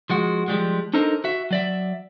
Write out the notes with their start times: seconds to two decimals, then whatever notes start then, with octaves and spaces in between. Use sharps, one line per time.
0.10 F3 G#3 F#4
0.48 F3 G3 G#3
0.93 D4 D#4 A4 A#4 C5 D#5
1.24 F#4 E5
1.51 F#3 D5 E5